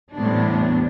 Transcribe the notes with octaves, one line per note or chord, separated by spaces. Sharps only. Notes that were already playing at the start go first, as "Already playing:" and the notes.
E2 A2 C3 G3 B3 D4